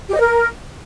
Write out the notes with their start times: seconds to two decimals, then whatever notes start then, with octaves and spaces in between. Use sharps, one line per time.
0.09 G4
0.15 D#5
0.20 A#4